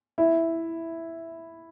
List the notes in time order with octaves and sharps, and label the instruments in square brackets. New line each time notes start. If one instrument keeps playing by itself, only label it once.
[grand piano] E4